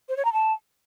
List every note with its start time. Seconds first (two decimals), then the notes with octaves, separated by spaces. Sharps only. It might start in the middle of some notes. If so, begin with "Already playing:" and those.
0.09 C5
0.17 C#5
0.25 A#5
0.33 A5